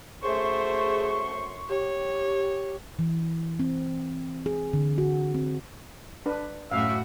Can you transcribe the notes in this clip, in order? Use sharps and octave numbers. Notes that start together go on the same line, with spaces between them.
F#2 A3 G#4 C5 C6 C#6
G4 C#5
E3
C4
G#4
D3
F#4
C4
D4 B4
F#2 A2 F#4 E5 F5